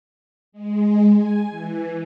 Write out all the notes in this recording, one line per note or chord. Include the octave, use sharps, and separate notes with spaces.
G#3
G#5
E3